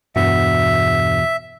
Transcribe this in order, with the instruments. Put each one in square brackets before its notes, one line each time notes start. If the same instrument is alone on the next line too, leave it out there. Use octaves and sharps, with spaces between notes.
[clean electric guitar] E2 B2 F#4 [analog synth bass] G2 [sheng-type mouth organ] E5